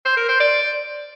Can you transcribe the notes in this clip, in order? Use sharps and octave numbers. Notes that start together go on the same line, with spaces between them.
C5
A#4
C5
D5